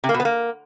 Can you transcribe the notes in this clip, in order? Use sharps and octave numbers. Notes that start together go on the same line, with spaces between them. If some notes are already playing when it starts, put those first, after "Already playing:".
C3
A#3
B2
B3
A#3